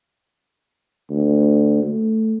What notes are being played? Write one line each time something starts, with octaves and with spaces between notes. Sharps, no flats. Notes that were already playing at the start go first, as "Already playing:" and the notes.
D2
A3